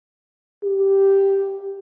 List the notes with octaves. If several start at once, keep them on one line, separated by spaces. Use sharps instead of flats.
G4